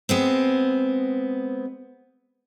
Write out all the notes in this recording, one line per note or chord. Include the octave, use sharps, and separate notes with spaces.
G#3 B3 C4